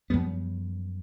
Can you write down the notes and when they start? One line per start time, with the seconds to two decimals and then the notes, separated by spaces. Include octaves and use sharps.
0.10 F#2 F3 G3 B3